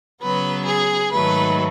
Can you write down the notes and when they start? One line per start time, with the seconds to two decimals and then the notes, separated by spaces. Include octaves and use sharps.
0.21 C#3 F#3 B3 B4
0.66 G#4
1.11 G#2 D#3 F#3 A3 B4